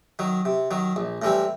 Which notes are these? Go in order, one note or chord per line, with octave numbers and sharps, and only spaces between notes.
D#3 F#3
C3
D#3 F#3
A#1
A2 E3 G3 C4